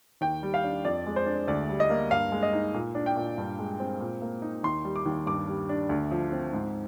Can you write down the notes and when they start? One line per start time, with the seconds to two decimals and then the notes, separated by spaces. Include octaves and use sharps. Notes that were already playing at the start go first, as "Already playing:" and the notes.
0.21 D#2 G5
0.43 G3
0.54 F5
0.64 D4
0.85 F2 D5
1.06 G#3
1.16 C5
1.26 D4
1.48 D2 D5
1.69 G3
1.80 D#5
1.90 A#3
2.11 G2 F5
2.32 G#3
2.43 D#5
2.53 D#4
2.74 A#2
2.95 D4
3.06 G5
3.16 A#2
3.38 G2
3.59 G#3
3.80 C4
4.01 A#2
4.22 A#3
4.42 D#4
4.63 D#2 C6
4.85 G3
4.96 D6
5.06 D#2
5.27 G2 D6
5.48 G3
5.69 D4
5.89 D2
6.11 F3
6.32 C4
6.53 G#2